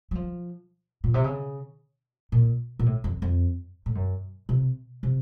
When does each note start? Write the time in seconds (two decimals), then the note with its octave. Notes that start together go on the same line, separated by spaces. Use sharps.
0.11 F#3
0.15 F3
1.04 A#2
1.14 C3
1.24 C#3
2.32 A#2
2.79 A#2
2.86 A2
3.04 F2
3.22 F2
3.86 A2
3.95 F#2
4.49 C3
5.03 C3